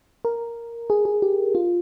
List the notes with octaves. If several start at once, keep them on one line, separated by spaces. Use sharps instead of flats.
A#4
G#4
G#4
G4
F4